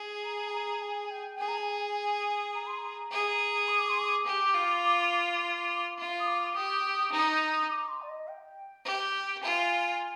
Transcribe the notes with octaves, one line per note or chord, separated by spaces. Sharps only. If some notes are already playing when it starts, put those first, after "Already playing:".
Already playing: G#4
A#5
G#5
A#5
G#5
G5
G#4 G#5
A#5
G#5
A#5
C6
A#5
G#4
D#6
D6
C6
D6
G4
F4
F4
D#6
D6
G4 D#6
D#4
D6
C6
D5
D#5
G5
G4
F4 G#5